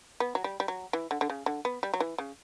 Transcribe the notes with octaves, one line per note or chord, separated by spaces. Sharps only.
B3
F#3
G3
G3
F#3
E3
D3
D3
C#3
D3
B3
G3
F#3
E3
C#3